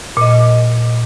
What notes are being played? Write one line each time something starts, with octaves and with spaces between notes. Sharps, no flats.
A#2 D#5